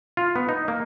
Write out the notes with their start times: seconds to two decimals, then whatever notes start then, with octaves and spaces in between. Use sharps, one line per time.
0.17 F4
0.36 B3
0.49 D#4
0.68 A#3